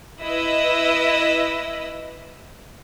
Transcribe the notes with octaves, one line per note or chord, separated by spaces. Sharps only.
E4 B4 D#5 E6